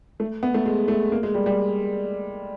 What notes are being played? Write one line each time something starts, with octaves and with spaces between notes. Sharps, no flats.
A3
B3
A3
G#3
A3
A#3
G#3
G3
G3